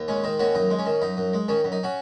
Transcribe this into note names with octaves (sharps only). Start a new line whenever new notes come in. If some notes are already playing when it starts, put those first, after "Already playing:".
Already playing: D#2
G#3 C#4
D#3 D#4
D#2 C#4 F#4
F#2 D#4
G#3
C#4
D#3
F#2 D#4
F#2
G#3
D#3 C#4
F#2
D#4
C#4 F#4